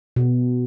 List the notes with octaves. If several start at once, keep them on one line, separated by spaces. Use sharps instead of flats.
B2